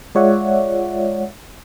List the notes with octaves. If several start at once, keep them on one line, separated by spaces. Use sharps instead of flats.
G#3 F4 C#5 D5 E5 F#5